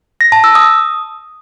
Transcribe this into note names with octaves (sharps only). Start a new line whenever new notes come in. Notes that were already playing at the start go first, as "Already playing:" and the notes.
A#6
A5
E6
D#6